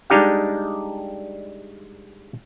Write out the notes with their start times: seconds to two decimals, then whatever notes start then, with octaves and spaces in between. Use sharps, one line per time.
0.10 G3 G#3 D4 D#4 G4 F5